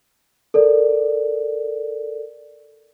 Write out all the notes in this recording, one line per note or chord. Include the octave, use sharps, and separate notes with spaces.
A4 A#4 D5